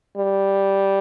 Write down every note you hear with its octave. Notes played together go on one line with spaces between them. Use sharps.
G3